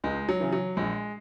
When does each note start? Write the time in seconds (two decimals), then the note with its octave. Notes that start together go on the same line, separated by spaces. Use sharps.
0.04 C#2 G#3
0.29 F#3
0.40 C#3 E3
0.52 F#3
0.77 A#1 G#3